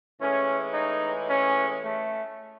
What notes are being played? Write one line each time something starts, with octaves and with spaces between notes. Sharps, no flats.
A2 E3 G#3 C#4
D#4
C#4
A3